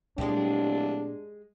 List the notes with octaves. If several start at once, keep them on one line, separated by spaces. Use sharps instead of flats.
D1 A#2 G#3 D4 G4